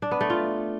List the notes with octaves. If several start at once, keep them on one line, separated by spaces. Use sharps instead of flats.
D4
B3
A3
F4